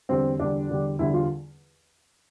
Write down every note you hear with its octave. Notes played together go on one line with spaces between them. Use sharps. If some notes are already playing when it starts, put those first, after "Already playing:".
E2 D3 G3 C4
E2 D3 G3 D4
E2 D3 G3
E2 D3 G3 E4
F4